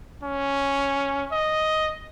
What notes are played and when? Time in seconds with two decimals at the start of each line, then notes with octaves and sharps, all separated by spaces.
0.23 C#4
1.32 D#5